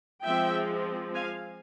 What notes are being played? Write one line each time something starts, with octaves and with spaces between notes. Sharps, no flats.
F3 G#3 C4 E5 G5
F5 G#5